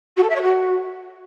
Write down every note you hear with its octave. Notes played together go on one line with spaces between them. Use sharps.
F#4
A4
E5
C#5
F#4